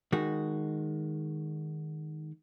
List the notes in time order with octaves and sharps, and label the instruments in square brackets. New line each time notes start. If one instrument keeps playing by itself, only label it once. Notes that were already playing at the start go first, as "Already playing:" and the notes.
[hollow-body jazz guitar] D#3 G#3 F#4